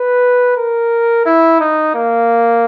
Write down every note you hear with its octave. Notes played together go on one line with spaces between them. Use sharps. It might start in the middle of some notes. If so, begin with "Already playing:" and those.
Already playing: B4
A#4
E4
D#4
A#3